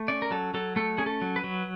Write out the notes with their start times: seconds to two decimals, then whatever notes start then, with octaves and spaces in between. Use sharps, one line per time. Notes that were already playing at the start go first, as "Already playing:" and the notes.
Already playing: A3
0.08 C#4 D5
0.22 A#4
0.31 F#3 A4
0.54 F#3 A4
0.76 A3 A4
0.98 C#4 G#4
1.06 A4
1.22 F#3
1.36 B4
1.44 F#3